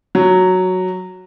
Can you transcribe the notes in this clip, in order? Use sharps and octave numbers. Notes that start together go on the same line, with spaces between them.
F#3